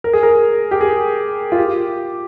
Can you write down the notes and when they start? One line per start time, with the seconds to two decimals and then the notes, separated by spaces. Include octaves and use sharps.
0.04 A#4
0.13 G#4
0.23 A#4
0.71 G4
0.81 G#4
1.52 F4
1.58 G4